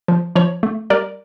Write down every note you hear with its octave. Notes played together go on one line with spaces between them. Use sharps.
F3
F3 C#5
A3
G3 A#4 D5